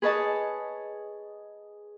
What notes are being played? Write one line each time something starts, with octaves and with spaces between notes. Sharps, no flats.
G#4 B4 C#5 D#5 A5